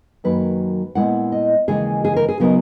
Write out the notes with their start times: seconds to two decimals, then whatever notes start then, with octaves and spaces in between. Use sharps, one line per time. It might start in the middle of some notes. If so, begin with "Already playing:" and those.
0.24 F#2 D#3 F#3 A#3 B4
0.95 A#2 G#3 B3 E4 F#5
1.32 D#5
1.68 D#2 C#3 E3 G#3 G#4
2.05 G#4
2.16 A#4
2.29 G#4
2.40 C#3 F#3 B3 D#4 A#4